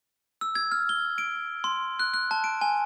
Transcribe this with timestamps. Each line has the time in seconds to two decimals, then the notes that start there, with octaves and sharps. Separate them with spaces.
0.41 E6
0.55 G#6
0.72 F6
0.89 G7
1.18 D7
1.64 C6
2.00 F#6
2.14 F#6
2.31 A5
2.44 D7
2.61 G#5